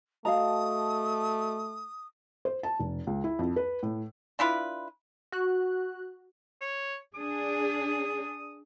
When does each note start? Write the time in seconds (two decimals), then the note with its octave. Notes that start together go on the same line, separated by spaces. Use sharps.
0.25 A3 F#4 D#5 F5 A5 A#5 D#6
2.45 C5
2.63 A5
2.80 F1
3.07 C#2
3.24 E4
3.39 F2
3.56 B4
3.83 A2
4.39 D4 E4 F4 B4
5.32 F#4 F#6
6.61 C#5
7.14 D4 G#4 D#6